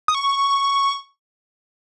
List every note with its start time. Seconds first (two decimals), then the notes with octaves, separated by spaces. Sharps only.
0.08 D#6
0.15 C#6